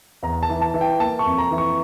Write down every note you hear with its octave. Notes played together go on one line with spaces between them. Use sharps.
E2 A#5
A5
E3
A5
E3
G5
A#3 A5
C#6
F2
A#5
E3
C#6